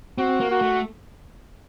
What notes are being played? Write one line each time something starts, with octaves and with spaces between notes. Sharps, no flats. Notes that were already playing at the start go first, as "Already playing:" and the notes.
C4 F#4
A#3
F#4
A3